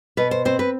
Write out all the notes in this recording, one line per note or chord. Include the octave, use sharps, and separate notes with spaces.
B2 B4
C5
C4 C5
B4